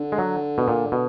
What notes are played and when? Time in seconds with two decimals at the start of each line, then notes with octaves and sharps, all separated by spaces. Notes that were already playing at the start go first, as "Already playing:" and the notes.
Already playing: D3
0.12 G#3
0.18 F#3
0.58 B2
0.68 A#2
0.92 B2